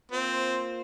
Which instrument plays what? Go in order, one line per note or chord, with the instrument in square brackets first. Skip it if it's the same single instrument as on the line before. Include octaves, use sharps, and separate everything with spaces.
[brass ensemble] A#3 F4 C5 [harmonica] C4